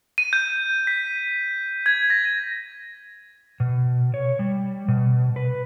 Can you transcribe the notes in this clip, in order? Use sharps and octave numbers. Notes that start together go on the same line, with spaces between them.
D#7
G6
B6
G#6
A#6
B2
C#5
G3
B2
B4